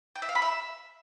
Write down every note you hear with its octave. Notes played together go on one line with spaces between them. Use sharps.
G5
E5
F5
B5
E5